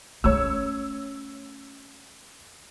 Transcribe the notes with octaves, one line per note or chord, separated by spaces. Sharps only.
A3 C#4 C#5 E6